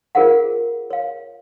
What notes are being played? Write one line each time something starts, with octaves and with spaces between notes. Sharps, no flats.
F4 G#4 A#4 C5 F5 F#5
C#5 F5